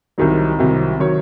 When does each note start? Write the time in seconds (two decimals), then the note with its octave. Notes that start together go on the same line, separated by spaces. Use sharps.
0.18 C2 C3 D#3 F#3 D#4
0.59 C2 C3 D#3 F#3
1.00 C3 D#3 F#3 C#5